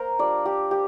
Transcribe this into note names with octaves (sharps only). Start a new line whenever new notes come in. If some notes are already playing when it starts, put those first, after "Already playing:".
Already playing: A#3 A#4 C5
G3 D4 F4 D5
G4
G4